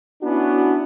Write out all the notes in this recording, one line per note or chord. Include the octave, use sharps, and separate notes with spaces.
B3 C#4 D4 E4 F#4